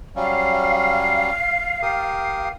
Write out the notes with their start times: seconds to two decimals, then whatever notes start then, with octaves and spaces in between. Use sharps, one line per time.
0.16 F#3 G3 C#4 F5
1.82 G4 A#4 D#6